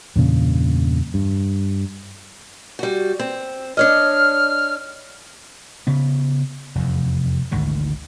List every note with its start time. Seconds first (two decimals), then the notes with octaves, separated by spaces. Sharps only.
0.16 E2 G2 A#2 C#3
1.14 G2
2.79 G3 F#4
3.19 C4
3.77 D4 C#5 D#5 F6
5.87 C#3 B3
6.75 F1 E2
7.51 G#1 D2 G#2 D#3